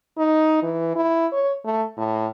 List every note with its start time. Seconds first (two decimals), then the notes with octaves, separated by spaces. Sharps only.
0.18 D#4
0.63 E3
0.96 E4
1.32 C#5
1.65 A3
1.97 A2